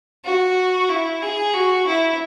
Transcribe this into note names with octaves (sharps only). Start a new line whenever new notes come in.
F#4
E4
G#4
F#4
E4